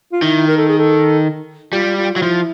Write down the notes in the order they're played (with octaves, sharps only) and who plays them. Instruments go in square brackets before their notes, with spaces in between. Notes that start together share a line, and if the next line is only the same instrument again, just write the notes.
[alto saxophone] F4
[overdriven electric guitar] D#3 [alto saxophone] E4
[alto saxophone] A#4
A4
G#4
A4
[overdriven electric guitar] G3 [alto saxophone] F4
[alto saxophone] F4
[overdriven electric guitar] F#3 [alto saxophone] F4
[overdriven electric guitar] F3 [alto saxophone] E4